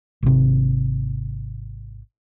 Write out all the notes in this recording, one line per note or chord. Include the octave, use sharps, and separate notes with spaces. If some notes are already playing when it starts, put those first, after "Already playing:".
G#1 C3